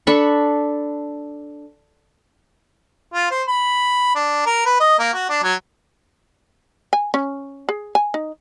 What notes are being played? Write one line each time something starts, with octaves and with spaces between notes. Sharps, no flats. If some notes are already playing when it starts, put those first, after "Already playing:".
D4 A4 B5 C#6
F4
C5
B5
D4
A#4
B4
D#5
A#3
F#4
D4
F#3
G#5
C#4
G#4
G#5
D#4